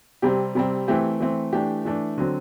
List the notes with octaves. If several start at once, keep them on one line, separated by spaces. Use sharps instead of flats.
C3 G3 C4 G4
C3 G3 C4
E3 A3 C4 G4
E3 A3 C4
E3 A3 D4 G4
E3 A3 D4
D3 F#3 C4